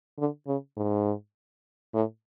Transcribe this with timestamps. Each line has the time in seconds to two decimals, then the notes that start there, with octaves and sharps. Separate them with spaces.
0.18 D3
0.47 C#3
0.77 G#2
1.94 A2